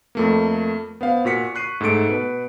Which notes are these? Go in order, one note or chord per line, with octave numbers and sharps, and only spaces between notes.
F2 A3 A#3
B3 C5 F5
A#2 F#4 B6 C#7
C#6 F#6 C7 D#7
G#2 A3 A4 C#7 D7
B2 B4